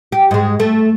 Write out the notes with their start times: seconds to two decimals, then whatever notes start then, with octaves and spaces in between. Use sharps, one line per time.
0.12 G4
0.31 G#2 G#3
0.60 A3